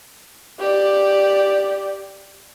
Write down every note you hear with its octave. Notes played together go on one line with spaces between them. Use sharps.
G4 D5